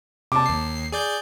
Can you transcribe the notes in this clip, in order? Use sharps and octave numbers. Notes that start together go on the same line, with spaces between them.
C3 A5 D6
D#2 C7
G#4 D5 G6